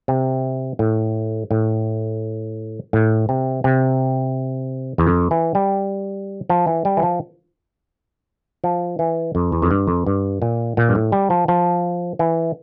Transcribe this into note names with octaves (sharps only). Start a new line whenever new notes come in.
C3
A2
A2
A2
C3
C3
E2
F2
E3
G3
F3
E3
G3
E3
F3
F3
E3
F2
E2
F2
G2
F2
G2
A#2
A#2
G2
A2
G3
F3
F3
E3